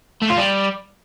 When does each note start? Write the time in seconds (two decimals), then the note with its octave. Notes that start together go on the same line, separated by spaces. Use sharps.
0.22 A3
0.30 F4
0.38 G3